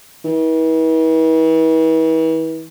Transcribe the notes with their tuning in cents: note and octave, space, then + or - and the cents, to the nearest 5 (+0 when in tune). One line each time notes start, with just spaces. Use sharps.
E3 -40